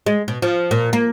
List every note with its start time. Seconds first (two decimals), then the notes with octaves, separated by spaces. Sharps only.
0.06 G#3
0.28 B2
0.42 F3
0.71 A#2
0.93 A#3